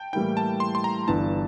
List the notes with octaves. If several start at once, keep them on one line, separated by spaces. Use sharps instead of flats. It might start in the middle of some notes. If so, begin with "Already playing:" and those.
Already playing: G5 A5
A2 E3 G3 A#3 E4 G5
A5
C6
C6
A#5
G1 G2 E3 A5